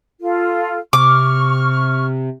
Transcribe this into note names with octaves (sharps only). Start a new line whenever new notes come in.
F4 A4
C3 C#6 D6 F6